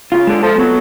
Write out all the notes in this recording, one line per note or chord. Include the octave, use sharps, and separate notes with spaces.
C#3 F4
D3 G#3
F3 A4
F#3 B3